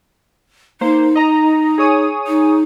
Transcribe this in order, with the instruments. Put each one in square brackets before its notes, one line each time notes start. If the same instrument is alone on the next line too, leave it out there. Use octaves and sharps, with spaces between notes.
[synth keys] A#3 C5 [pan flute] D#4
[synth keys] D#5 A#5
G#4 C#5 D#6
[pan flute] D#4